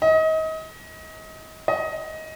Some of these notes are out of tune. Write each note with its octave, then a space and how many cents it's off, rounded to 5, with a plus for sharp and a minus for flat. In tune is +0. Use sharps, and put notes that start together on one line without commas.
D#5 +30
D#5 +20